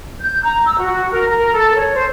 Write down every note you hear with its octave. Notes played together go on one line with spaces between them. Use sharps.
G6
A#5
E6
F#4
A#4
A#4
A4
C#5
C5